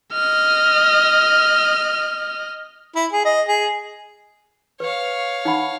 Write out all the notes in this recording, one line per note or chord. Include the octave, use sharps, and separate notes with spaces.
D#5 F6
E4
G#4
D#5
G#4
B4 C#5 F5
D#4 F#5 B5